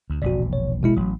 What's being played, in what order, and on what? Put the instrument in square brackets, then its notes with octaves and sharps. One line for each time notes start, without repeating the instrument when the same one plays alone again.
[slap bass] D2
[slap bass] E1 A#1 C3 [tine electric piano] F#4 D5
[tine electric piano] C#5
B2 G#3 E4
[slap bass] A1 [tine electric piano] F#3